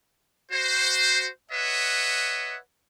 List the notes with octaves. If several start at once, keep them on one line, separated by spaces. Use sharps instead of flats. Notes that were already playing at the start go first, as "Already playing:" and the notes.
F#4 C5
B4 C#5 D#5 E5 F#5